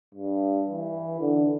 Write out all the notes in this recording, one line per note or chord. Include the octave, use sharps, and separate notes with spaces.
G2
E3
D3